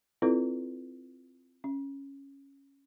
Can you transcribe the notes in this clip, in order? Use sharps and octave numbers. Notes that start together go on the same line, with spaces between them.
C4 E4 F4 A4 B4 D5
C#4